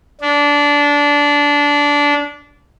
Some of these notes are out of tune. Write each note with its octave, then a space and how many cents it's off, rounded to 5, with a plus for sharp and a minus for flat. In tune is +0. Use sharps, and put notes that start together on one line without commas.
D4 -20